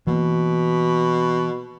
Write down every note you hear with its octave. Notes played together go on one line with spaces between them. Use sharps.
B2 E3 A#3